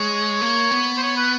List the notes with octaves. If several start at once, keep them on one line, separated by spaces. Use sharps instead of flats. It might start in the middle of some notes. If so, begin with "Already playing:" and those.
Already playing: G#3 C#5
A#3
B3
C5
C#5
B4